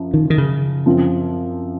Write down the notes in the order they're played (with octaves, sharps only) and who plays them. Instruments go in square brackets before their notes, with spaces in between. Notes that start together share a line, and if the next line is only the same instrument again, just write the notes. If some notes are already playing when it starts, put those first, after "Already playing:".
Already playing: [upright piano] F#2 F3
[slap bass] D#3
D#3
C#3
[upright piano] F#2 F3 C4 F4